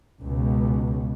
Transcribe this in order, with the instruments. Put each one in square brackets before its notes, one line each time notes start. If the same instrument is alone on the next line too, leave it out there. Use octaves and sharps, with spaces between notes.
[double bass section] C#2 B2